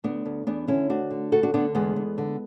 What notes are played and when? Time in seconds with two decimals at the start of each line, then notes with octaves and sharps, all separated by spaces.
0.04 D2 B3 D4
0.26 D2
0.47 E2 B3 D4
0.68 D3 C#4 E4
0.90 D2 D4 F#4
1.11 D3
1.32 D2 F#4 A4
1.43 D4 F#4
1.54 D3 B3 D4
1.75 E2 G#3 B3
1.96 E2
2.18 D3